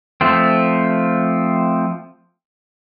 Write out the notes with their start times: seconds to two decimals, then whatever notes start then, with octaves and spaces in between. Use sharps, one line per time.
0.21 F3 A3 C4